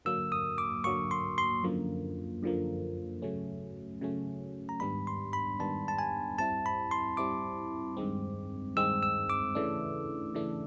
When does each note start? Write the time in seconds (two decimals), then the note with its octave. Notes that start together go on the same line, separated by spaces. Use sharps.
0.05 D3 F#3 A#3 E6
0.32 D#6
0.58 D6
0.84 D3 F#3 A#3 C#6
1.11 C6
1.38 C6
1.63 F#2 D3 F3 A#3
2.43 F#2 D3 F3 A#3
3.22 C#3 F#3 A3 C#4
4.01 C#3 F#3 A3 C#4
4.69 A#5
4.80 G#2 D#3 G3 B3 D4 B5
5.07 C6
5.33 B5
5.59 G#2 D#3 G3 B3 D4 A5
5.88 A5
5.99 G#5
6.38 G3 C4 E4 A5
6.66 B5
6.91 C6
7.17 G3 C4 E4 D6
7.97 G2 D#3 G#3 C4
8.76 G2 D#3 G#3 C4 E6
9.03 E6
9.30 D6
9.55 C#3 E3 A3 D4
10.34 C#3 E3 A3 D4